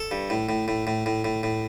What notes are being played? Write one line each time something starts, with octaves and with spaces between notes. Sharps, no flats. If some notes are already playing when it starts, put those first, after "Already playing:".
Already playing: A4
G2
A2
A2
A2
A2
A2
A2
A2